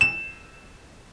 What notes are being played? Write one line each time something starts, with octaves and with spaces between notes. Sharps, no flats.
E7